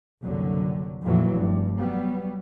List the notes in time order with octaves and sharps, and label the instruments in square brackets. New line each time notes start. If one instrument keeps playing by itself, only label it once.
[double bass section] F#1 C2 D3 F#3
F2 A#2 E3 F#3
F1 G2
F#3 G3 B3